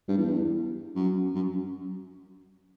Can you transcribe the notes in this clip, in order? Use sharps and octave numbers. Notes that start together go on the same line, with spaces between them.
G2
E2
F#2
F#2